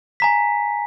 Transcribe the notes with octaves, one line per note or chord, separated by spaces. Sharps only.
G#5 A#5 B6